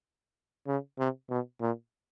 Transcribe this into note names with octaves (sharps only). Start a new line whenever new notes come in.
C#3
C3
B2
A#2